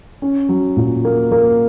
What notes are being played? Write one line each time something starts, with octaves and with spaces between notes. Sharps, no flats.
C#4
F#3
A#2
A#3
A#3